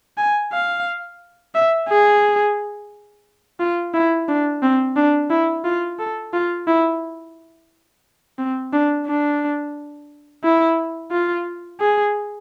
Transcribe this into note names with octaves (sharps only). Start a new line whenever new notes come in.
G#5
F5
E5
G#4
F4
E4
D4
C4
D4
E4
F4
A4
F4
E4
C4
D4
D4
E4
F4
G#4